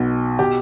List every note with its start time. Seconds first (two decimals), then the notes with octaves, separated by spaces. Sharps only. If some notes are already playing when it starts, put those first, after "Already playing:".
Already playing: B1 B2
0.39 B2 G4